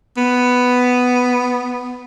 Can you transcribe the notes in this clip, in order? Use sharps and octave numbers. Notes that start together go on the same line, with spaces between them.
B3